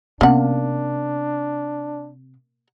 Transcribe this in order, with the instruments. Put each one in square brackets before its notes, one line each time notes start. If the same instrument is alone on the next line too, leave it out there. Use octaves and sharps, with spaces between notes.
[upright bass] C3 [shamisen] A#3 F#5 [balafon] B3 C#4 [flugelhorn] D4